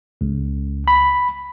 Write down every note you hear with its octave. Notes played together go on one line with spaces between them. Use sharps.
C#2
B5